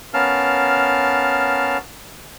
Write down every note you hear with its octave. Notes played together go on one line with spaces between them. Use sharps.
B3 C#4 A#4 F5 A5 F6